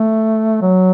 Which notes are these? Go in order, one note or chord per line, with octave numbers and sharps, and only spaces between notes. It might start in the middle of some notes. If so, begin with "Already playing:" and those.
Already playing: A3
F#3